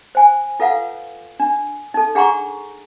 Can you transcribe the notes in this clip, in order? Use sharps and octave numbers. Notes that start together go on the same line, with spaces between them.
C5 G#5
F4 A4 B4 F5 F#5
D4
D#4 A4
D4 G#4 F#5 A#5 C6 C#6